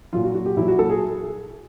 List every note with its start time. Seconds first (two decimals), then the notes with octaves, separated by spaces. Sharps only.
0.13 A#2 F#3 F4
0.24 F#4
0.35 F#4
0.46 G4
0.57 A#2 F#3 E4
0.68 F#4
0.79 A4
0.90 G#4